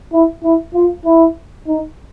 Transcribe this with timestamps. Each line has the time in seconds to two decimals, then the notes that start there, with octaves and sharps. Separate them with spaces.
0.12 E4
0.43 E4
0.74 F4
1.05 E4
1.67 D#4